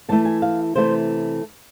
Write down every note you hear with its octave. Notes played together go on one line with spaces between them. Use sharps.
C3 E3 A3 E4 A5
G#5
F5
C3 E3 A3 E4 C5